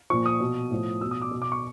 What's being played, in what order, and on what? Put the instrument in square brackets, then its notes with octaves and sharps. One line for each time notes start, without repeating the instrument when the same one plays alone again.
[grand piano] A#2 F3 C#6
D#6
B2
A2 F3
B2 E6
D#6
D6
B2
D6
C#6